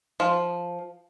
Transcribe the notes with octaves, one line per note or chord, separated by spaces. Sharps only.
F3